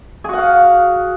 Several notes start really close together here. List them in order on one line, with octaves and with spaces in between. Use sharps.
G#4 F#4 F#5 F5